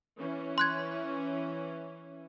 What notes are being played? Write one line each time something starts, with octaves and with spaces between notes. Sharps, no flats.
E3 C#4
C6 F#6 G#6